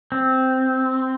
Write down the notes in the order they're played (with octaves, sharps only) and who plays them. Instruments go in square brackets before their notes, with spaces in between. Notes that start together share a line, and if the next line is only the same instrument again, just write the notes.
[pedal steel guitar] C4